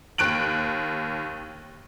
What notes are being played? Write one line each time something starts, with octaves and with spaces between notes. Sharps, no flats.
D#2 F#6 D7 F#7